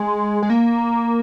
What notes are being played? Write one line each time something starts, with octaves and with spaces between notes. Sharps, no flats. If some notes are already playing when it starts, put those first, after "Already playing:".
Already playing: G#3
G#3
A#3